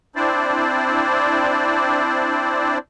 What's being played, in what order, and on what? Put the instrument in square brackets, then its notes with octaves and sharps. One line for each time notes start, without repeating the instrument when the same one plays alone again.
[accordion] C4 D4 E4 C5 D5